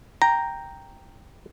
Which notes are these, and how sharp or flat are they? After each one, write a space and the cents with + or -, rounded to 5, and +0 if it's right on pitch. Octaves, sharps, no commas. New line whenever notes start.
G5 +0 A#5 +0